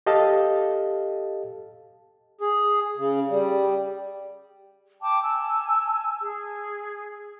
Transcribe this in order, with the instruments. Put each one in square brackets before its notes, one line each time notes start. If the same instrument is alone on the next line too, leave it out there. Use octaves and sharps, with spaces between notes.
[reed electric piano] G4 A4 D#5 F5 A5
[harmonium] G#4
C#3
G3
[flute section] G5 A5 D6
G#5 A5 E6
G#4